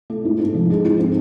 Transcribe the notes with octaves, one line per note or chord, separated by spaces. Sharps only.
A3
G#2
G#2
F3
G#3
G#2
C4